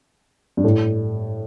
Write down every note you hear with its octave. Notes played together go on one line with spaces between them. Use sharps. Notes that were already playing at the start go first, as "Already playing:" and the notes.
G2
A2